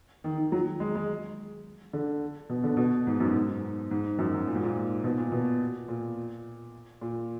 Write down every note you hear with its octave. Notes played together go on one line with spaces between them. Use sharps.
D#3
D#3
F#3
G#3
G#3
D3
B2
D3
B2
G#2
F#2
G#2
G#2
F#2
F#2
A#2
G#2
A#2
B2
A#2
B2
A#2
A#2